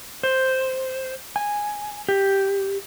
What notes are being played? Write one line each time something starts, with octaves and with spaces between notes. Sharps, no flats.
C5
G#5
G4